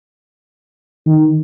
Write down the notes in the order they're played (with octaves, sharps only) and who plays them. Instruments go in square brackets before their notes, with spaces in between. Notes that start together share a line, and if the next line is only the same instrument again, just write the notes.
[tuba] D#3